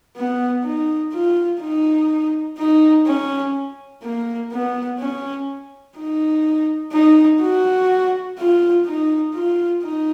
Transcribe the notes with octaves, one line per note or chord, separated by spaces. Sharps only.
B3
D#4
F4
D#4
D#4
C#4
A#3
B3
C#4
D#4
D#4
F#4
F4
D#4
F4
D#4